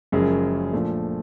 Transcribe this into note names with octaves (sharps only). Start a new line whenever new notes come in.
F#1 F#2 C#3 F3 G#3
A#2 F3 A3 D4